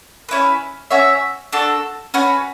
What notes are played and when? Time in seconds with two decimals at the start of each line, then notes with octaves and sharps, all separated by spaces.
0.29 C#4 E4 B4
0.91 C#4 F#4 C#5 E5
1.52 D4 F#4 A4
2.14 C#4 F#4 B4